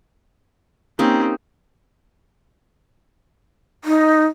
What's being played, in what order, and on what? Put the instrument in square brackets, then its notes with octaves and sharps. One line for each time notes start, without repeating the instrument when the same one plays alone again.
[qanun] A#3 D#4 G4 [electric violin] C4 C#4
[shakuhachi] D#4